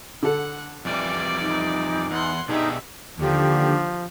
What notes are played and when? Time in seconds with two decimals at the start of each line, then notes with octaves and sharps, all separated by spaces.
0.23 D3 A4 F#5
0.85 F2 E3 G3 D5 D6
1.41 D#4
2.11 E2 F#5 C6
2.48 B2 D4 D#4 G4 G#4 E5
3.17 D#2 D3 F3 G4